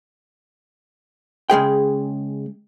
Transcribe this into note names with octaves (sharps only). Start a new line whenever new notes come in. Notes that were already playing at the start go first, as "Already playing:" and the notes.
C#3 G#3 G#4 G5